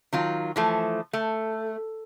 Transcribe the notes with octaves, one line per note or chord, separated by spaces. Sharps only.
D#3 F#3 F4
E3 F3 A3
A3